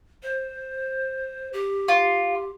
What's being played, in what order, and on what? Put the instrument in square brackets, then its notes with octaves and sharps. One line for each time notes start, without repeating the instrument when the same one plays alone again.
[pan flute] C5
G4
[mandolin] F4